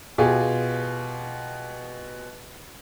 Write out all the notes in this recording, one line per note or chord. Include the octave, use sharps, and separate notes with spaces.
B2 F4 G4 G#4